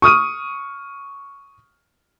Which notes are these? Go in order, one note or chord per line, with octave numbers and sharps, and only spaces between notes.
C#6 D#6 F6 D#7